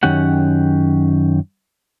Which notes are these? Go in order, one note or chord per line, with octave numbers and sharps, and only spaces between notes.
F#2 D#3 C#4 G4 F#5